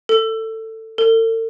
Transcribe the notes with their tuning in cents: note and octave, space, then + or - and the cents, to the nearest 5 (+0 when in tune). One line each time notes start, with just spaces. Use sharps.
A4 +20
A4 +45